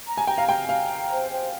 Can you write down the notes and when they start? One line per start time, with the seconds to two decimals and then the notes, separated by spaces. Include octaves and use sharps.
0.07 A#5
0.17 G#5
0.27 G5 A#5
0.38 F5
0.48 G5 A#5
0.69 F5 A#5
0.89 G5
1.10 C5
1.31 C5